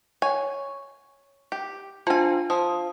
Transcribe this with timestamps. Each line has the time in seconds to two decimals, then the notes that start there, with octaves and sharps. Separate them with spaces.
0.22 C#5 G#5
1.52 G4
2.07 F3 D4 F4 G#5
2.50 F3 D#6